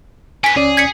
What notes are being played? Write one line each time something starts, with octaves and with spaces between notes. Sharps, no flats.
C#4 B4 G#5 B6
C#2 C#4 G#4 D5
G#6 B6 C#7